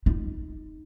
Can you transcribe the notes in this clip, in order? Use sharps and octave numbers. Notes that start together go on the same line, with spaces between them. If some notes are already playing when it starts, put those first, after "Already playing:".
D#4